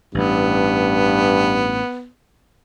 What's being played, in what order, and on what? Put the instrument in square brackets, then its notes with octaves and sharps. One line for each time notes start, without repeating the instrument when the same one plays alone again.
[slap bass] A1 [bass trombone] G2 [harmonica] B3